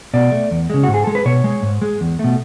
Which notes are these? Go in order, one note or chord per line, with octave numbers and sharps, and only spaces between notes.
B2 D5
A3
E2
C#3 G#3
G#2 F#4
G#4
G#3 A4
B4
B2 C#5
G#3
G#2
G#3
E2
B2 A3